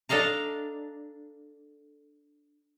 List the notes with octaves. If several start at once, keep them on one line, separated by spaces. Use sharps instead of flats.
D4 A4 D#5 F5 A#5